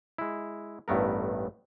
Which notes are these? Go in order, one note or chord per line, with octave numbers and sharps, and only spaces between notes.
G#3 E4
A1 G2 A3 B3 A#4